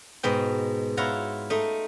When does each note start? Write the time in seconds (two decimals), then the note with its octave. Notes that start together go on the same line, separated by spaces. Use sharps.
0.23 G#2 B2 G5
0.97 E4 F4 C#5 F#5 A#5
1.50 A3 D#4